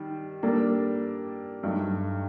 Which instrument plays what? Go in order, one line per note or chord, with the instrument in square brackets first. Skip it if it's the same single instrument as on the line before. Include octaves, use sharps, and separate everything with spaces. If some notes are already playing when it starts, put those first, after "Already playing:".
Already playing: [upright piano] D#3 G3
G3 A#3 D4 A4
G2 F#3 A3 D#4